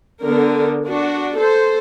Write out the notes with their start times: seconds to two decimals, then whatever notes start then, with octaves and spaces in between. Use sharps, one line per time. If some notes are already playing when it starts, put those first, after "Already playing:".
0.21 D3 B3 A#4
0.86 D4 F#4
1.37 A4 C5